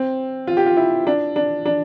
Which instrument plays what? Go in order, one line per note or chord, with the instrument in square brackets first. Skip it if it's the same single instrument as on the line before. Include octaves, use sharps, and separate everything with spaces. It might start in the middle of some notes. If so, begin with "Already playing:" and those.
Already playing: [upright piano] C4
F4
G4
F4
E4
D4
D4
D4